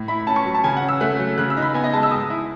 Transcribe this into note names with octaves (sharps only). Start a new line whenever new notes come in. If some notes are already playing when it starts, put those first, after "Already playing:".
Already playing: A2
E4 B5
C#4 A5
C#6
F#3
A5
C#3 G#5
F#5
C#4
E6
A3 F#6
F#3
C#3 F#6
E6
D#4
B5
B3 G#5
D#5
G#3 A5
E6
G#2 D#6
E4